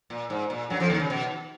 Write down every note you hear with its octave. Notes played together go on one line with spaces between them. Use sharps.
A#2
G#2
A#2
F#2 F#3
F2 F3
D#2 D#3
C#3
B2